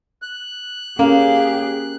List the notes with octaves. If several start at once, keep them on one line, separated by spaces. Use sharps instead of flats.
F#6
A#3 C#4 G4 G#4